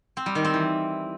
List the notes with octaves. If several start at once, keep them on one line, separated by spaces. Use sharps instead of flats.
C4
G3
D#3
C4
E3